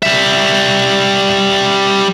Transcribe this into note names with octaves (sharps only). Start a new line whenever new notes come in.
G3 E5